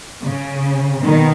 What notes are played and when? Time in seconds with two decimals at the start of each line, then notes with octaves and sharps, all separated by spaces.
0.21 C#3
1.03 B2 D#3